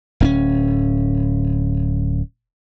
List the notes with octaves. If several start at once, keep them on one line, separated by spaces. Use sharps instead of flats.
D1 C4 C#4